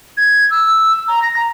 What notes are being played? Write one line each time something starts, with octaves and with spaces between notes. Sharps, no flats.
G#6
E6
A#5
A#6
A#5